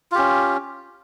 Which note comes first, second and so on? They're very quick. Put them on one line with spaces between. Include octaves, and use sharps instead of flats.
F4 G4 C#4